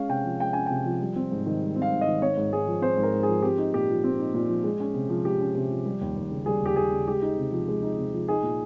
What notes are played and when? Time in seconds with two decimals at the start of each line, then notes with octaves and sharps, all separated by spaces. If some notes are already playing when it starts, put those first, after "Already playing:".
Already playing: G#3 C#4 F5
0.09 C3 G5
0.25 F3
0.40 G#3 G5
0.53 C#4 G#5
0.66 C3 G5
0.85 F3
1.01 G3
1.16 C4
1.31 G#2
1.46 D#3
1.62 G3
1.76 C4
1.82 F5
1.91 G#2
2.01 D#5
2.07 D#3
2.22 C4 C#5
2.37 G#2
2.52 G#2 G#4
2.67 F3
2.82 C4 C5
2.97 G#2
3.03 A#4
3.13 G#2
3.23 G#4
3.28 F3
3.43 C4 G4
3.58 D#4
3.73 A#2 G4
3.89 F3
4.04 C4
4.19 D#4
4.34 A#2
4.49 F3
4.64 G#3
4.80 C#4
4.94 C3
5.09 F3
5.25 G#3 G4
5.41 C#4
5.55 C3
5.71 F3
5.86 G3
6.01 D#2
6.16 D#2
6.31 C#3
6.46 G3 G#4
6.62 D#2 G4
6.76 D#2 G#4
6.92 C#3
7.08 G#3 G4
7.22 D#4
7.38 C3
7.52 F3
7.68 G#3
7.83 D#4
7.98 C3
8.13 F3
8.28 D#4 G#4
8.43 A#2